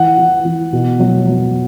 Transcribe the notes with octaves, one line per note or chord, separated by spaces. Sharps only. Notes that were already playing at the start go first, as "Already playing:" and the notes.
Already playing: E3 F#5
E3
E3
B2
F#3
F#3